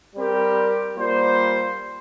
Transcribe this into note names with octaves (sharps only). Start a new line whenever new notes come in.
G3 C4 G4 A#4
G3 A#3 F4 C5